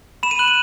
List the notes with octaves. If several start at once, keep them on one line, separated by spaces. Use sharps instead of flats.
B5 E7
D#7
F#6 F#7
D#7